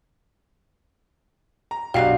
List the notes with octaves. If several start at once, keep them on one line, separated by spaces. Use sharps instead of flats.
A#5
B1 D4 F#4 G4 F5 C7